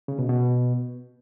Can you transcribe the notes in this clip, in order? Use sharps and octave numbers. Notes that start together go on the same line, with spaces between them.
C#3
B2
B2